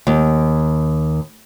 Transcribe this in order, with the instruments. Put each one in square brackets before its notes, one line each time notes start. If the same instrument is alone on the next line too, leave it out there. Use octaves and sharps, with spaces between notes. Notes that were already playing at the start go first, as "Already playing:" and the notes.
[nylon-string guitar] D#2